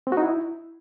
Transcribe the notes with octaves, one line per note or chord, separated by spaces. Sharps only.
C4
F#4
D#4
E4